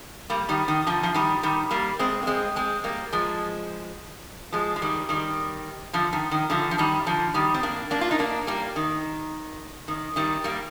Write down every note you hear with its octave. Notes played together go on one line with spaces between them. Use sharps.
G3 A#3
D#3 G3
D#3
D3 F3
F3
D#3 G3
D#3 G3
G3 A#3
G#3 C4
A#3
G#3 C4
G#3 C4
G3 A#3
F3 G#3
F3 G#3
F3
D#3 G3
D#3 G3
D3 F3
D#3
D#3
D3 F3
F3
D#3 G3
D3 F3
D#3 G3
C4
A#3 D4
A#3 D4
F4
D#4
A#3 D4
G3 A#3
D#3
D#3
D#3 G3
G3 A#3